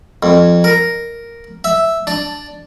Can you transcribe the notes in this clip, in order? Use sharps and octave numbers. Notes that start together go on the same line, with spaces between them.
F2
A#4
E5
D4